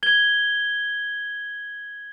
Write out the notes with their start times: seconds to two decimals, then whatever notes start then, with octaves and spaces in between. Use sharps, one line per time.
0.03 G#6 G7